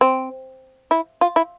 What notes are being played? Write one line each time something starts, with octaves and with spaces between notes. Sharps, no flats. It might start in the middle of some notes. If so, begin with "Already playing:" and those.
C4
E4
F4
E4